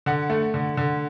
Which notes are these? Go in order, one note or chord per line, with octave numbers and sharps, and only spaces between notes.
D3 F#5
A3
D3
D3